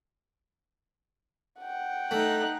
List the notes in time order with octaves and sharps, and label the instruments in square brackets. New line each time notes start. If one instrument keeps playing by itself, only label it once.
[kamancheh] F#5 G5
[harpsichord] A3 [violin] D#4 F#6